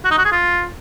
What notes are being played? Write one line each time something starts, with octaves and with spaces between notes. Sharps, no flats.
F#4
D#4
F#4
G#4
F4